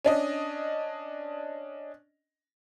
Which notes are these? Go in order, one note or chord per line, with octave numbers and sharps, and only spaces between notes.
C#4 D4 D#5